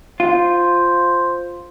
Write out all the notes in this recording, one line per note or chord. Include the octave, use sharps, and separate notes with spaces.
F4 C5